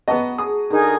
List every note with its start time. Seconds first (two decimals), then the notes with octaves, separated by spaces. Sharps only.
0.08 B3 F#4 D#5 A5 A#5
0.38 G#4 D#6
0.70 D3 D#4 G#4 A#4